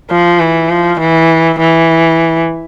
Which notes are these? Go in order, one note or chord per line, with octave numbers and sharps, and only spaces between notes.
F3
E3
F3
E3
E3